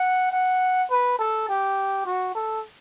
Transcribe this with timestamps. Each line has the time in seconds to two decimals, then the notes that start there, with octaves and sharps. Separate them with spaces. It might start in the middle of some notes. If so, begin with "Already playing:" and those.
Already playing: F#5
0.32 F#5
0.90 B4
1.19 A4
1.49 G4
2.06 F#4
2.35 A4